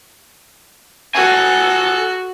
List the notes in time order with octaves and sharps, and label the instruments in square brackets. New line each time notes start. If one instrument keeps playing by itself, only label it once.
[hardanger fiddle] F#4 [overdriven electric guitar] A4 G#5